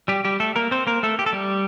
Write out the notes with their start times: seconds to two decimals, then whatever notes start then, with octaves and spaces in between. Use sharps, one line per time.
0.08 G3 G4
0.25 G3 G4
0.40 A3 A4
0.56 A#3 A#4
0.71 C4 C5
0.87 A#3 A#4
1.03 A3 A4
1.19 G4
1.26 A4
1.33 G3 G4